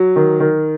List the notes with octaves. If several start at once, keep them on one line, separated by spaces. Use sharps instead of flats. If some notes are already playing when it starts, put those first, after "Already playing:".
Already playing: F#3
D#3
D#3